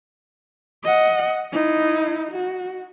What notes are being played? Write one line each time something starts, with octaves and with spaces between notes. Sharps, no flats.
D#5 F#5
D#4 E4
F#4